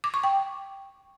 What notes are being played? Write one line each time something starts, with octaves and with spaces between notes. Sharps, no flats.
D6
C#6
G5